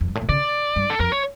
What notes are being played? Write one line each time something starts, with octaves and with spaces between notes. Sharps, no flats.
F2
G2
A2
A#2
C#3 D5
G2
A4
F2 A#4
C#5